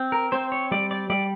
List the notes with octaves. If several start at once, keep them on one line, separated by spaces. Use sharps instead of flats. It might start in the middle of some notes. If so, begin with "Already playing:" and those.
Already playing: C4
A#4
C4 C5
C#5
G3 D5
D5
G3 D5